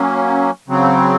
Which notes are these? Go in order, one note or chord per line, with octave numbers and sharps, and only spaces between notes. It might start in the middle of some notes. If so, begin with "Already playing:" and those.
Already playing: F#3 A#3 C#4
C#3 F#3 C4